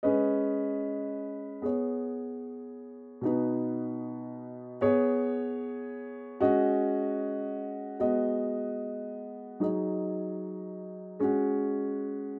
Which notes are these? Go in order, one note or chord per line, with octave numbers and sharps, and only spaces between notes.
G#3 C#4 B4 D#5
B3 G#4 C#5
B2 B3 D#4 B4
B3 G#4 C#5
G#3 C#4 F#4 D#5
G#3 B3 F#4 D#5
F#3 D#4 G#4 D#5
G#3 C#4 F#4